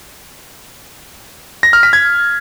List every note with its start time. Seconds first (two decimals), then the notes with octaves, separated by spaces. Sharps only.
1.63 A#6
1.73 F6
1.83 B6
1.93 G#6